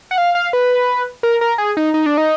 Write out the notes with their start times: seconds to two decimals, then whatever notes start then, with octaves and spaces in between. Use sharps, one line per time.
0.11 F#5
0.18 F5
0.35 F5
0.53 B4
1.23 A#4
1.41 A#4
1.58 G#4
1.77 D#4
1.94 D#4
2.06 D4
2.18 D#4